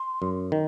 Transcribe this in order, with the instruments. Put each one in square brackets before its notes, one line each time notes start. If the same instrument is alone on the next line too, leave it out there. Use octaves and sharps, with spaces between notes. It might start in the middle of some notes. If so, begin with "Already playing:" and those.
Already playing: [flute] C6
[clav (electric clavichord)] F#2
D#3